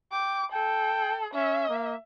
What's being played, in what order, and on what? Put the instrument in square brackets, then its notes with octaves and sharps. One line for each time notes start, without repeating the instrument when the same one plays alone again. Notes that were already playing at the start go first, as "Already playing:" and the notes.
[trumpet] G5 [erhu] D6
[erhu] A4 [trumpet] G5
[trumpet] C#4 [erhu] E5
[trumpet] A#3